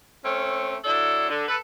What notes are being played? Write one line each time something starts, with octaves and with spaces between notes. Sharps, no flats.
A3 C4 C#4
F#3 D4 E4 A4
D3
A4 B4